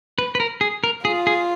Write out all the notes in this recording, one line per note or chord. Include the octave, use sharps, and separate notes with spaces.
B4
B4
A#4
G#4
A#4
F4 G#4
G#4